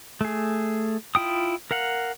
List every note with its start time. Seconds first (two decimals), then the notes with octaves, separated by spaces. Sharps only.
0.21 A3 G#4
1.15 E4 F4 G5 D#6
1.71 A#4 F5 F#5